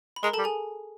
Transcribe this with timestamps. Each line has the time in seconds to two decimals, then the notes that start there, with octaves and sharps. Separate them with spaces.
0.16 B5
0.23 G#3 A#4 A#5
0.33 A4 A5
0.39 G3
0.44 G#4 G#5